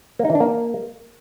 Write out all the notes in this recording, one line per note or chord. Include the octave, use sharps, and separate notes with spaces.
A#3
D#4
E3
D4
A#3